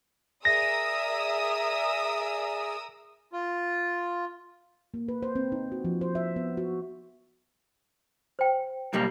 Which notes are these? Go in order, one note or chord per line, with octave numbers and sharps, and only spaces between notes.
G#4 A#4 D5 E5 G#5 D#6 E6 A#6
F4
A#3
B4
C5
C4
D#4
F#4
F3
C5
E5
B3
F#4
C5 G5
B1 G3 A#3